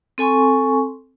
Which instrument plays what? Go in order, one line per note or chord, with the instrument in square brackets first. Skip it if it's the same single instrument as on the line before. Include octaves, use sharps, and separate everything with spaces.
[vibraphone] C4 A4 G#5 C6 C#6